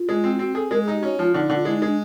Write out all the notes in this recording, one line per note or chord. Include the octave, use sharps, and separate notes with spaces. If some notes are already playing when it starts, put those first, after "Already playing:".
Already playing: F4
G#3
C4
F4
C4 F#4
G#4 A4
G#3 A#4
G#4
D#4 G4
C#4 F#4
F3 F4
D3 D#4
D3
F4
G#3 E4
D#4
G#3 D4